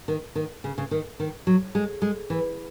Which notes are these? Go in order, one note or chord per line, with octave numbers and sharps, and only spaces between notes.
D#3
D#3
C#3
C#3
D#3
D#3
F#3
G#3
G#3
E3